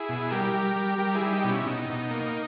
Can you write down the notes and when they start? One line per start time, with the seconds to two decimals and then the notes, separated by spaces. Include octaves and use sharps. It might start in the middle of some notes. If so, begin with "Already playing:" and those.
Already playing: E4 G#4
0.09 B2
0.31 G3 G4 A#4
0.54 G3
0.76 G3
0.98 G3 G4 A#4
1.15 E4 G#4
1.21 G3
1.32 D#4 G4
1.44 B2 C#4 E4
1.66 B2 D#4
1.89 B2
2.11 A#3